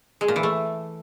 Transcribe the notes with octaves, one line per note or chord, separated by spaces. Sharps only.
G#3
A#2
E3
A3